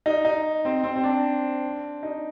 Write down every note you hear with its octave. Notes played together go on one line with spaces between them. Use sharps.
D#4
D#4
C4
C4
C4
D4
D#4